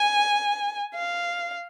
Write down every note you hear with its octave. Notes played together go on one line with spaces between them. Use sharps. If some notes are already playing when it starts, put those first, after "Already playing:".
Already playing: G#5
F5